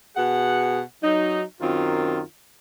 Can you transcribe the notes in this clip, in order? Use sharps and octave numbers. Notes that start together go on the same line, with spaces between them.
B2 G#4 F#5
F#3 D#4
F#2 D#3 C4 F4